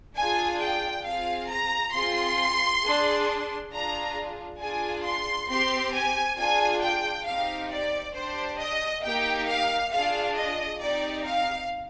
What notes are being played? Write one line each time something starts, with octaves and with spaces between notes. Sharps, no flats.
D4 F4 G#4 G#5
G5
C4 F4 G#4 F5
A#5
C4 F4 G#4 C6
D4 G#4
D4 F4 G#4 A#5
D4 F4 G#4 G#5
C6
C4 G4 C6
G#5
D4 F4 G#4 G#5
G5
C4 D#4 G4 F5
D5
D4 G4 C5
D#5
A#3 D#4 G4 G5
F5
D4 F4 G#4 F5
D#5
C4 D#4 G4 D5
F5